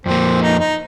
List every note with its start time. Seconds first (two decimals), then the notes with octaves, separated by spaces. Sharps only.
0.06 F2 F3 A#3 C4
0.42 D#4
0.60 D#4